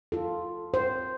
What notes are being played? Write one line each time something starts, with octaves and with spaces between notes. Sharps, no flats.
F4 A4
C5